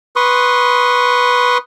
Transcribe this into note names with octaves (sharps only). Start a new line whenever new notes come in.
B4 C6 C#6 D#6